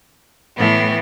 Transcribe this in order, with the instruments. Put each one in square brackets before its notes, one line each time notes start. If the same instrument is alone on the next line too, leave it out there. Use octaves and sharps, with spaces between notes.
[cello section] A2 [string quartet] E3 B3